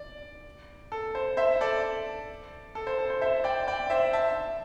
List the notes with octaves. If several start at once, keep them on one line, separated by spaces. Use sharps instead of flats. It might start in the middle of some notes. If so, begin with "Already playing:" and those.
Already playing: D5
A4
C5
C5 E5
A4 D5
A4
C5
A4
C5
C5 E5
D5 G5
D5 G5
C5 E5
E5 A5